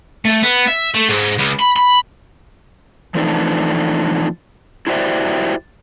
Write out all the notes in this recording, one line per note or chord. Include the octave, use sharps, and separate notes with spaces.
A3
B3
E5
A3
G#2
C#2
B5
B5
E3 F3 A3 C4 D4 D#4
E4 F#4 G4 C5 D5 E5